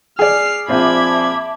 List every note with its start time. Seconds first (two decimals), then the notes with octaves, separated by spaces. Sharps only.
0.19 G#4 D5 F6 C7
0.68 A#1 C4 F4 E5 A5 B5 D6 G#6